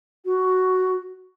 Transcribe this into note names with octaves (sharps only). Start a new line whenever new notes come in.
F#4